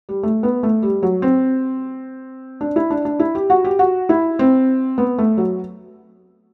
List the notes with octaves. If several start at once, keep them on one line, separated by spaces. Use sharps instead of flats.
G3
A3
B3
A3
G3
F#3
C4
D4
E4
D4
D4
E4
G4
F#4
G4
F#4
E4
C4
B3
A3
F#3